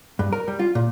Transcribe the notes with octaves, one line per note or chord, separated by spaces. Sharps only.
G2
A#4
G3
F4
A#2